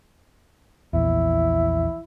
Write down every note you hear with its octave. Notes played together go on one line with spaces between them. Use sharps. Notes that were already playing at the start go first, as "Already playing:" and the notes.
A#1 E2 E4